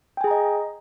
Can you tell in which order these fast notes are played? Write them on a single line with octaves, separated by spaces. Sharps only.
G5 G#5 G#4 A#5 D#5